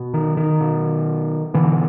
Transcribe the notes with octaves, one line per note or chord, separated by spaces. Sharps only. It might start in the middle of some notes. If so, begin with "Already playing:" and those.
Already playing: B2
D#3
D#3
B2
B2 D3 E3